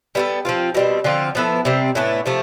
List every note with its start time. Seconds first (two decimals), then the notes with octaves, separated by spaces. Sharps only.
0.15 G3 B3 F4 A4
0.45 F3 C4 F4
0.74 B2 G3 C4
1.04 D3 F3 C4 F4
1.35 F3 B3 E4 A4
1.65 C3 G3 C4
1.95 A2 E3 B3 D4
2.26 C3 F3 A3